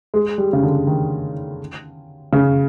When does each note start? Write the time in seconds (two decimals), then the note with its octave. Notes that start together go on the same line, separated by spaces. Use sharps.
0.14 G#3
0.38 G3
0.53 C#3
0.63 D3
0.87 D#3
2.33 C#3